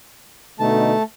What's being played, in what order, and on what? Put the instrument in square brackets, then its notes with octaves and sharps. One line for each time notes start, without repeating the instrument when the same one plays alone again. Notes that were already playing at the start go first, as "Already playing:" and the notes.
[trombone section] B2 D3 D#4 [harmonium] A3 A5